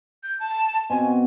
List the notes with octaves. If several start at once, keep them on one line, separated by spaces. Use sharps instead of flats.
G6
A5
B2 C4 G#5